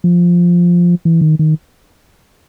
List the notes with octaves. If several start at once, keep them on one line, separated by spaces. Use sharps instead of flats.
F3
E3
D#3
D#3